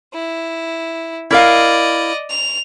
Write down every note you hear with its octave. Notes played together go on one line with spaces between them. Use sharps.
E4
E4 A#4 D5 D#5 F5
F7